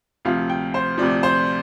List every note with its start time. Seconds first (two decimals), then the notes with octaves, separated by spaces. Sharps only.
0.25 D2 C3 F3 F5
0.50 G5
0.74 C5
0.98 D2 C3 F3 D5
1.23 C5